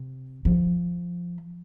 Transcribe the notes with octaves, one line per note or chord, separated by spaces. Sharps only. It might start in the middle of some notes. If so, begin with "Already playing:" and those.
Already playing: C3
F3